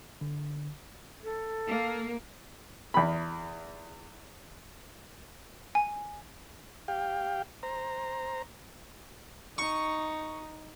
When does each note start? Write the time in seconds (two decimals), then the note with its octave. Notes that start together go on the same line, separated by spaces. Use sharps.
0.21 D3
1.23 A4
1.68 A#3
2.94 E2 B5
5.75 G#5
6.88 G4 F5 G5
7.63 C5 A#5
9.58 D#4 C#6